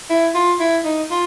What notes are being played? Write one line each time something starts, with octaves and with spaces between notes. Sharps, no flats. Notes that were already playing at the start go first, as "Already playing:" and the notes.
E4
F4
E4
D#4
F4